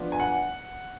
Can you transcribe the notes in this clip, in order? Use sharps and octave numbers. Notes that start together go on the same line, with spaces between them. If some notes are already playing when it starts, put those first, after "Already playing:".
Already playing: F3 B3 D4
G#5
F#5